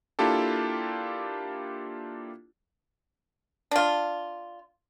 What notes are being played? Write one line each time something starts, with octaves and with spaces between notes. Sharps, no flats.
A#3 D4 E4 F4 G4 A4
D4 F4